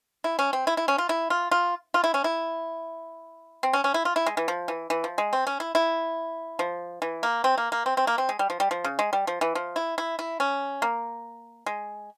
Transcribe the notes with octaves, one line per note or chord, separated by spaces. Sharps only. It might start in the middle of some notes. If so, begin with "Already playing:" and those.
E4
C#4
C4
E4
E4
C#4
F4
E4
F4
F4
F4
E4
C#4
E4
C4
C#4
C#4
E4
F4
E4
G#3
E3
F3
E3
E3
F3
G#3
C4
C#4
E4
E4
F3
E3
A#3
C4
A#3
A#3
C4
C4
A#3
C4
G#3
G3
F3
G3
F3
C#3
G#3
G3
F3
E3
F3
E4
E4
E4
C#4
A#3
G#3